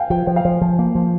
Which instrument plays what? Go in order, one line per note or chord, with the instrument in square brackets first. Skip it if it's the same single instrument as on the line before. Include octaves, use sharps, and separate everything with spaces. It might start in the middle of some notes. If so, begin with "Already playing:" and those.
Already playing: [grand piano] F5 G5 G#5
[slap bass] F3 [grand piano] G5
[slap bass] F3 [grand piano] G5
[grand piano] F5
[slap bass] F3
F3
A#3
F3